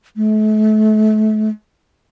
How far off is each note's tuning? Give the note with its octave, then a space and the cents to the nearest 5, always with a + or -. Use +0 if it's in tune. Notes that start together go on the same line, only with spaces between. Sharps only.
A3 -35